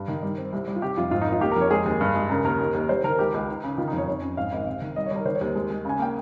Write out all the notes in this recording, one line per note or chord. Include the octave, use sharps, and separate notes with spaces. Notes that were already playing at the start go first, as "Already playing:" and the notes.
Already playing: G2
D#3
G3
C4
C2
G3
F4
C3 G4
F2 F4
G#2 F4
D#4
G#1
F4
A#3 G4
A#4
F2 C#5
G#3 G#4
D#2
G2
G#3
C#3 A#4
D#2 A#4
D#2
D#2
C2 C5
D#3 A#4
C#2 G4
C#2
D#4
C#3
D#3 F4
D#4
F2 C#5
F2 C#5
C#4
G#2 F5
G#1
C3
D#3
G3 D#5
C#5
G3 A#4
D#3 C5
C#5
D#2
G#3
G#3
C#3 G#5
A#3 G5